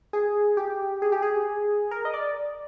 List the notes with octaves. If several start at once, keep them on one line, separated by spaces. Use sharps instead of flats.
G#4
G4
G#4
G4
G#4
A#4
D#5
D5